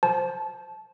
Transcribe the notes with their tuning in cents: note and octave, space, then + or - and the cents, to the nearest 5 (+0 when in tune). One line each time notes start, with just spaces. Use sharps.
C5 +0 A5 -20